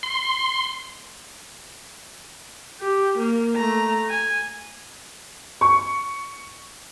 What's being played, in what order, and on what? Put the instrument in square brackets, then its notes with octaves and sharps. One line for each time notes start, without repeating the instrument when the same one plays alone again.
[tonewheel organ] C6
[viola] G4
A#3
A3 A#5
G#5
[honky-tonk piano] C#6